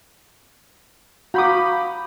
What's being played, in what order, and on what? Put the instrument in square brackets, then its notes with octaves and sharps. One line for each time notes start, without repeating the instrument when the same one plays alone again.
[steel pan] F#4 D#6 [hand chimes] F5 G6 B6 [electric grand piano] A#5 B5 D6